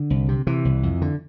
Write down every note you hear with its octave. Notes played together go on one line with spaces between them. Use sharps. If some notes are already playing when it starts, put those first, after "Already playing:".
Already playing: D3
C2
C3
C3 E3
C2
F2
D3